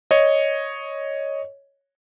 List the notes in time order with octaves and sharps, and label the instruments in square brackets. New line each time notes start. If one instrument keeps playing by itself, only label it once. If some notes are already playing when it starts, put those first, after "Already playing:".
[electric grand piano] C#5 D#5